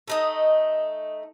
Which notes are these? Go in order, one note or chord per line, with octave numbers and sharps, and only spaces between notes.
A3 D#4 D#5